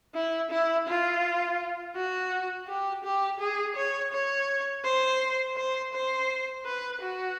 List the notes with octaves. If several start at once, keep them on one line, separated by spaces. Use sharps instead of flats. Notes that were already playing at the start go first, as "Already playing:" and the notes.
E4
E4
F4
F#4
G4
G4
G#4
C#5
C#5
C5
C5
C5
B4
F#4